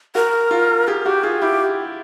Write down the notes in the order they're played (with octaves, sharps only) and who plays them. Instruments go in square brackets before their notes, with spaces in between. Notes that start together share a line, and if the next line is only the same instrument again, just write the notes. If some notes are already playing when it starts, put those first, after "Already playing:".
[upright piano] F#4 [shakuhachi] A#4
[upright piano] F4
[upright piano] G4 [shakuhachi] G#4
[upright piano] F#4 [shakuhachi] G4
[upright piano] F4 [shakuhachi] G#4
[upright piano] E4 [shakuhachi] G4